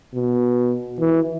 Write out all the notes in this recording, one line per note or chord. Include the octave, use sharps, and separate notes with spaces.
B2
E3